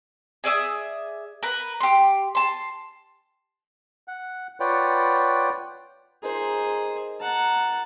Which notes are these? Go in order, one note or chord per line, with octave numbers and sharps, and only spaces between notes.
G#4 D5 E5 D#6
A#4 B4
G4 C6
A5 C6
F#5
F4 B4 C#5 D5 F#5 G5
D#4 F4 G#4 A#4 C5
F#5 A5 A#5